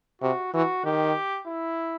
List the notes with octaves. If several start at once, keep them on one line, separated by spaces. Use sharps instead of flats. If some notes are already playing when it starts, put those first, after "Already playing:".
C3 F#4
E3 F#4
D#3 G4
E4